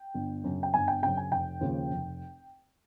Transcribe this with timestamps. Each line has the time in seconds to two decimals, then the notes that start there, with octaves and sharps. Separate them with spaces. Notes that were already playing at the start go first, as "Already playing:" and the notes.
Already playing: G5
0.14 G1
0.44 F#2 C#3
0.63 G5
0.74 G1 G#5
0.88 G5
1.02 F#2 C#3 G5
1.17 G#5
1.32 F1 G5
1.61 D#2 C#3 F3
1.91 F1